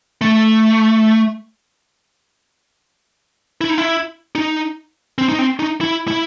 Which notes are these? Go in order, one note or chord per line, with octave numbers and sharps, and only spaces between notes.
A3
E4
D#4
E4
D#4
C4
D#4
C4
D#4
E4
E4